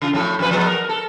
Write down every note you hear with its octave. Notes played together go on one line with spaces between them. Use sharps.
C#3 F4
F2 A2 A4
F2 B4
F3 G#3 B3
A#4
A4